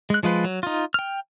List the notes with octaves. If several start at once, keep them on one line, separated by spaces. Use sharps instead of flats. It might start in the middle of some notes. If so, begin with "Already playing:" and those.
G#3 F#6
F3 G#3 F4 B4
F#3
D#4 F4
G5 F6